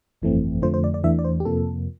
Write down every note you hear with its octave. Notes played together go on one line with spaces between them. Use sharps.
G1 F2 E3 A3 C4
F2 D3 F3 A3 C5
C5
D5
D5
E2 E3 A3 D4 E5
D5
C5
G4
F2 C3 F3 A#3 A4